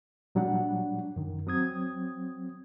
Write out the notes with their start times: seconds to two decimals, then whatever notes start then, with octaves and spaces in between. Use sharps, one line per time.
0.35 A#2 F#3 G3 D4 F#5
1.16 F#2 D#3
1.47 F#3 C4 D#6 G#6